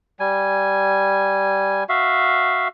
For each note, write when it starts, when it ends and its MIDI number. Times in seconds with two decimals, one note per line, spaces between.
0.20 1.84 55
0.20 1.84 80
1.89 2.68 66
1.89 2.68 76
1.89 2.68 77